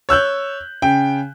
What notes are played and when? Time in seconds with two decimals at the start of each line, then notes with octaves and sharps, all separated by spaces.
0.09 C#5 E6 F#6 G6
0.82 C#3 G5